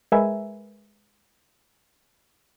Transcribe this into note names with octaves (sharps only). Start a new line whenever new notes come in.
G#3 A#4 B4 E5 G#5